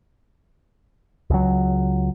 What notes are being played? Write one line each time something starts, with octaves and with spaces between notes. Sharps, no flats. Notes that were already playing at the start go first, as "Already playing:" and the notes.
C#2 F#3